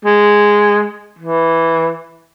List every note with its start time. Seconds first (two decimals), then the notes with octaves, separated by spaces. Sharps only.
0.05 G#3
1.19 E3